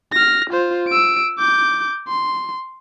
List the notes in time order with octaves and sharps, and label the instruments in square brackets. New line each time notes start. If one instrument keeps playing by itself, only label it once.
[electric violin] F6 A#6
F4 C5
E6 D7
D6 G6
C6